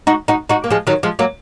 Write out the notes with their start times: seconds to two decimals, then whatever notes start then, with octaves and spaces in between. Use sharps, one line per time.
0.07 D#4 F#4
0.28 D#4 F#4
0.49 D#4 F#4
0.64 A#3
0.70 F3 G#3
0.87 D#3 F#3
1.03 F3 G#3
1.19 F#3 A#3